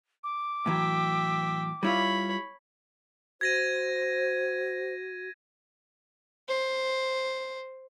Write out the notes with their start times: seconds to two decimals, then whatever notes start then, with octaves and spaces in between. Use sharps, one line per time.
0.24 D6
0.66 A2 E3 F#3 E5 G5
1.83 G3 E4 F4 C#5 B5
3.41 F#4 C5 G#6 A#6 D#7
6.48 C5